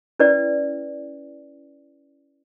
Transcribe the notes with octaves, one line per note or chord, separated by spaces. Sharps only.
C#4 E4 B4 D5 G5